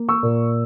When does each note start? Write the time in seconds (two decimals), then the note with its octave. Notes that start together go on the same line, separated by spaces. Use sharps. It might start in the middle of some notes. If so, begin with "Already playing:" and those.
Already playing: A#3
0.09 C#6 E6
0.23 A#2